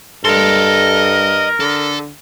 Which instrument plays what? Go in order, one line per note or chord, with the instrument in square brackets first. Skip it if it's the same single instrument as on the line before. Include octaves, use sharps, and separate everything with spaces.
[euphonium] G2 [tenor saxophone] A4 [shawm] A#4 [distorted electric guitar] D#5 C6
[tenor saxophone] D3 [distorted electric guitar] A4